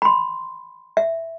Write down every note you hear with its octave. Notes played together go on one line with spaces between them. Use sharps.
B5 C6
E5